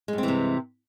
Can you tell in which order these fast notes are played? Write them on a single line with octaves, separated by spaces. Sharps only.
G#3 G2 C4 E3 C3